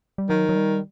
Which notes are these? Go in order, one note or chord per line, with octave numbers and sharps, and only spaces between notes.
G3
D#3 F#3
F#3
G3